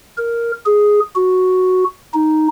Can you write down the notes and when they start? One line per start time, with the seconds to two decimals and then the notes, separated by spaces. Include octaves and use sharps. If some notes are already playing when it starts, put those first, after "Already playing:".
0.18 A#4
0.66 G#4
1.16 F#4
2.14 D#4